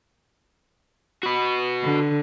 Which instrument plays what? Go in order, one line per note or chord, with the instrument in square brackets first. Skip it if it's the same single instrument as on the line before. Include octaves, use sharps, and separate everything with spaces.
[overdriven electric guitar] F#4 B4
[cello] D3